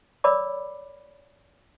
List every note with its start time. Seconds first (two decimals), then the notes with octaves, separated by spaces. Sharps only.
0.24 A#4 C#5 D5 B5 D6